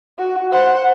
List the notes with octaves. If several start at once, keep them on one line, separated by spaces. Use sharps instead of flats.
F#4
C5 F#5